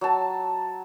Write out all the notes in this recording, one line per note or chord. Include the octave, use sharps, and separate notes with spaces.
F#3 A5